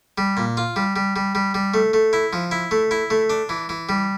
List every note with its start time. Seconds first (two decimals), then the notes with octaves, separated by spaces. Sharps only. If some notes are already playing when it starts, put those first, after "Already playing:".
0.18 G3
0.37 A#2
0.57 F4
0.76 G3
0.96 G3
1.16 G3
1.35 G3
1.54 G3
1.74 A3
1.93 A3
2.13 E4
2.33 F3
2.51 E4
2.71 A3
2.91 E4
3.10 A3
3.30 D4
3.49 E3
3.69 E3
3.89 G3